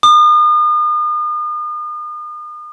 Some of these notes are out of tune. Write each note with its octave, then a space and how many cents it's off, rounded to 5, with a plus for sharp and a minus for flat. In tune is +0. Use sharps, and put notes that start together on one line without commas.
D#6 -40